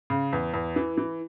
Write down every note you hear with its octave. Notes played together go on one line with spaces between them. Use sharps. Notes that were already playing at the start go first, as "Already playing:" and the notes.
C#3
E2
E2
E3
E3